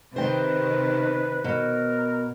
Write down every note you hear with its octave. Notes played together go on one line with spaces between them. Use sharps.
C3 D#3 B4 C5 G5
B2 A#4